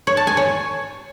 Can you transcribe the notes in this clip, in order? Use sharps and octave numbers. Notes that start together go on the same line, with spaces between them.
C#5
A5
G#5
C#5